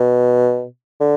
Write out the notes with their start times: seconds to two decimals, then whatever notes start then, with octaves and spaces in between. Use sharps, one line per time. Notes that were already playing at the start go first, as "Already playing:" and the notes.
Already playing: B2
1.00 D3